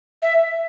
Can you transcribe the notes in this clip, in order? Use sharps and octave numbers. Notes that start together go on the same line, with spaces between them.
E5